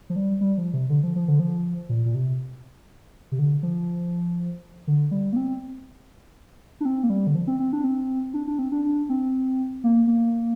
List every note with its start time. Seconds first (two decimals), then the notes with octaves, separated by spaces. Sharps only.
0.10 F3
0.16 G3
0.41 G3
0.58 F3
0.73 C3
0.90 D3
1.03 F3
1.16 F3
1.28 D3
1.40 F3
1.89 A#2
2.05 A#2
2.15 C3
3.32 C3
3.39 D3
3.63 F3
4.87 D3
5.11 G3
5.33 A#3
5.36 C4
6.81 D4
6.85 C4
7.03 A#3
7.10 G3
7.27 D3
7.35 F3
7.47 C4
7.60 C4
7.73 D4
7.84 C4
8.34 D4
8.47 D4
8.59 C4
8.72 D4
8.84 D4
9.09 C4
9.84 A#3
10.07 A#3